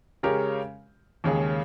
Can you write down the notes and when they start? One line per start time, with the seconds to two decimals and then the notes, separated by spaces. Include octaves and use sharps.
0.23 C#3 G#3 C#4 G4 A#4
1.24 D#2 C#3 G#3 C#4 G#4